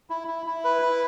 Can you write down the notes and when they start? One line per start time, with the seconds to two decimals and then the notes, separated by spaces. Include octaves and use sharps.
0.10 E4
0.28 E4
0.46 E4
0.64 B4
0.82 E4